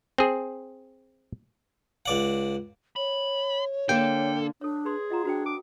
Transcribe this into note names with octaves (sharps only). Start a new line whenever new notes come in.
C4 G#4
C#2 D5 F#5
C#5 B5
D3 A#3 D4 A4 G5
D4 A4 C#5
G#4 B4 C6
F4 D#5 F#5 A#5
D4 F#4 C5 G5
A4 D6